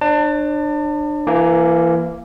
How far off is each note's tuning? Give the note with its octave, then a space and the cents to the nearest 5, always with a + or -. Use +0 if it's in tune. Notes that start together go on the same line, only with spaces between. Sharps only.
D4 +30 C#5 -30 A5 +35
E3 +30 A#3 +0